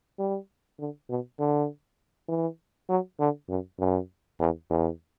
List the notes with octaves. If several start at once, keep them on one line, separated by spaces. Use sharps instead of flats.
G3
D3
B2
D3
E3
F#3
D3
F#2
F#2
E2
E2